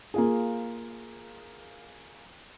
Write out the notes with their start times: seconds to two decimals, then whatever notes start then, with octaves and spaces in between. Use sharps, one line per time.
0.14 A#3 F4 G#4